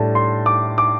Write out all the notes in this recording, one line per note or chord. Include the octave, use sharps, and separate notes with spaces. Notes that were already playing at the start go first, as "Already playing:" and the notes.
Already playing: A2 G3 D4 A5
C6
D6
D6